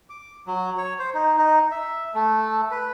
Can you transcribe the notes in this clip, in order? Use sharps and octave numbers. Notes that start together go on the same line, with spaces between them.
D6
F#3
C#5
C5
D#4
D#4
E5
A3
B4